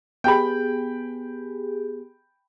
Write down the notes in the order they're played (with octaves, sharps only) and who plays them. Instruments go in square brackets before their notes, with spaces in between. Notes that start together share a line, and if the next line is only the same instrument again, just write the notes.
[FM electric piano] B3 G4 G#4 [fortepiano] G5 B5